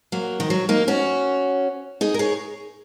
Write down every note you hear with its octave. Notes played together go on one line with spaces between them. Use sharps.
F#3 A#3
D#3
F#3
A#3 D#4
C#4 F#4
D#4 G#4
A#4
G#4 C#5